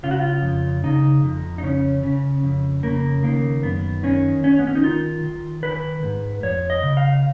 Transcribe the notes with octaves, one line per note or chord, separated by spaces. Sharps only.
C#3 F4
F#4
F4
F2
C#3 D#4
F2
D#4
C#3 C#4
C#3
F2
C#3 A#3
D#3 A#3
F#2 B3
D#3 C#4
D#3 C#4
B3
C#4
D#4
D#3 F4
D#3
D#3 B4
G#2
F2 C#5
D#5
C#3
F5